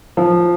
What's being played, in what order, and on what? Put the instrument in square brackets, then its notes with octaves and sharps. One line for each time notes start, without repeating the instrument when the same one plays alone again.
[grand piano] F3